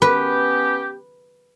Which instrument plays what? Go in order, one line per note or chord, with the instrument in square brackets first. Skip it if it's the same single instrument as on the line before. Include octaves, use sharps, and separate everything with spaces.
[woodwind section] B3 C#4 G4 [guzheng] B4